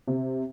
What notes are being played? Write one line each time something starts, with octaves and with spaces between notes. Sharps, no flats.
C3